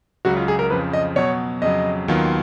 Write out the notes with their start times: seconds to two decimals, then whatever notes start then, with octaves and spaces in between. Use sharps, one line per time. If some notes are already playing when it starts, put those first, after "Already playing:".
0.25 C#2 C#3 F#3 F#4
0.37 F4
0.48 G#4
0.59 A#4
0.70 F2 C#3 F3 B4
0.93 D#5
1.16 B2 F#3 B3 C#5
1.62 F2 C#3 F#3 D#5
2.08 D#2 D#3 F#3 B3 F4